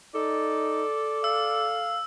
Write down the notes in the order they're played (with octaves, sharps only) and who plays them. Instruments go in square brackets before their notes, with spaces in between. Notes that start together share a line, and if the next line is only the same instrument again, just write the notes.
[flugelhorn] D#4 [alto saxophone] A4 [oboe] D5
[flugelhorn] F5 [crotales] E6